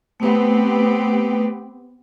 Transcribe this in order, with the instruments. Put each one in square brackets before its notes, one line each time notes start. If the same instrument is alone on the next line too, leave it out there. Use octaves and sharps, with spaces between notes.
[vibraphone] A3 B4 [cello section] B3 C4 G4